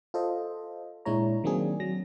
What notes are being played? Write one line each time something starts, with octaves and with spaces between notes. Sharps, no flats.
F4 A4 C5 D#5
A#2 G#3 D4 E4 C#5 A#5
D#3 F#3 A#3 C4 D4 G#4
F#3 A#6